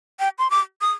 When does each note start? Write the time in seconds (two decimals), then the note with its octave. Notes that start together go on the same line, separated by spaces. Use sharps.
0.20 G5
0.38 C6
0.50 D6
0.81 D#6